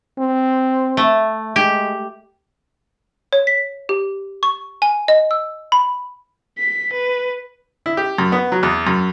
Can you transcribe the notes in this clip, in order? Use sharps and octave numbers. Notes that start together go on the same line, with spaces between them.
C4
A3
G#3 G4
C#5
B6
G4
C#6
G#5
D#5
E6
B5
B6
B4
E4
G4
F#2
B3
F#3
E2
F#2